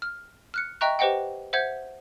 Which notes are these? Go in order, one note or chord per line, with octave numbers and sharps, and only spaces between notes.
F6
F6 F#6 C#7
D#5 E5 G5 A#5 C#6 F#6
G4 B4 C5 D#5 F#5 G5
C5 E5 F#5 G6 G#6